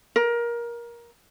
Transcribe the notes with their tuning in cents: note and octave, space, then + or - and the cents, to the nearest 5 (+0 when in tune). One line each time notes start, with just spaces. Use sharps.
A#4 +20